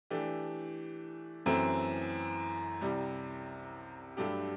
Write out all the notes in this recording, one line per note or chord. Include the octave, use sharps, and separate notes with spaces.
E3 A3 D4 G4
F#2 E3 A3 C4
C2 C3 G3
G2 F#3 A3 D4 G4